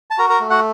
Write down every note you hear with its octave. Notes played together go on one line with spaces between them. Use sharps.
A5
F#4 A#4 A#5
A#4 A#5
A3
F#4 F#5